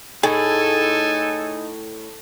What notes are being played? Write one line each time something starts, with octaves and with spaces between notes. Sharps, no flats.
A2 D#4 G#4 A4 G#5